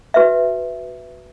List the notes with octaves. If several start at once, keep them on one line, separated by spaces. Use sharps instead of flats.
F#4 B4 E5